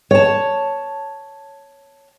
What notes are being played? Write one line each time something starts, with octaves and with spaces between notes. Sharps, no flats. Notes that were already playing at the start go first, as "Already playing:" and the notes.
C#5 A5